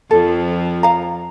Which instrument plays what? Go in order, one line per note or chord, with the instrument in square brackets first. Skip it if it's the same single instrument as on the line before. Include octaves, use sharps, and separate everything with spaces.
[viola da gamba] F2 F3 [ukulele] A4
[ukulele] F5 A#5